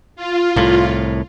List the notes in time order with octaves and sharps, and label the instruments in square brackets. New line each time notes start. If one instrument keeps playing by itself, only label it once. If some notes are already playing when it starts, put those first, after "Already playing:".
[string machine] F4
[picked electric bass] C2 A2